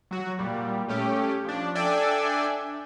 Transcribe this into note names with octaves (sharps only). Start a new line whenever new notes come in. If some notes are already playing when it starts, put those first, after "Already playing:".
F#3 F#4
A#2 G3
A3 C#4 G4
F3 D4
D4 A4 D5 E5 G5 G#5